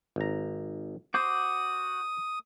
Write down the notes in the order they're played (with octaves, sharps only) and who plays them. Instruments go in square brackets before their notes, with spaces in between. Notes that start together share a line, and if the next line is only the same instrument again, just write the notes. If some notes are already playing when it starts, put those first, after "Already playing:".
[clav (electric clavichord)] G#1 A#5
[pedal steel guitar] F#4 D6 G6 [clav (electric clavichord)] C5 [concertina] D#6